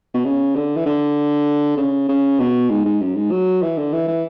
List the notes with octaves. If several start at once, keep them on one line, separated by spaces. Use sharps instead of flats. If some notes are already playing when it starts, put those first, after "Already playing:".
B2
C#3
D3
E3
D3
C#3
C#3
B2
G#2
G#2
F#2
G#2
F#3
E3
D3
E3
E3